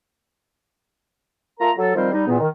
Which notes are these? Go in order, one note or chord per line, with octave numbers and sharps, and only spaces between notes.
A3 F4 A#4 A#5
F#3 A4
D#3 F3 G3 C4 A#4 C5
G3 D#4
E2 A#2 B3
D#3